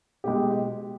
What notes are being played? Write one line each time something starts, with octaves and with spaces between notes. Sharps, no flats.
B2 G#3 G4